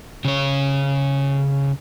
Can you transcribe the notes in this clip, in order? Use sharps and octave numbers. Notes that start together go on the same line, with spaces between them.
C#3 C#5